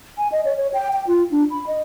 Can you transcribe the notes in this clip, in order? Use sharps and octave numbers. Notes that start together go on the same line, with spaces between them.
G#5
D#5
C#5
C#5
G5
G5
F4
D4
B5
D#5